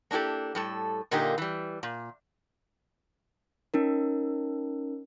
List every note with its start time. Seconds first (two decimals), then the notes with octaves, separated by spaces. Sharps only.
0.11 A#3 D4 E4 G4 A4
0.55 A2 G3 A4
1.11 A#2 D3 A#3 D#4 G4 A#4
1.38 E3 G3
1.83 A#2
3.74 C#4 D#4 A#4